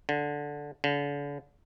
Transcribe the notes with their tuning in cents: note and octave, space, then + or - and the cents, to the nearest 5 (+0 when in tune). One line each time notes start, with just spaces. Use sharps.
D3 -5
D3 -40